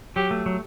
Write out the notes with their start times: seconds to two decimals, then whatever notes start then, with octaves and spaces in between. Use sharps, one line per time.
0.16 F#3 G4
0.31 A3
0.46 F#3